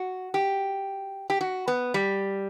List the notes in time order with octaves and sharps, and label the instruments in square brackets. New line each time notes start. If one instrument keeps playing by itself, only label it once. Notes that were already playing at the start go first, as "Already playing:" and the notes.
Already playing: [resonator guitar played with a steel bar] F#4
G4
G4
F#4
B3
G3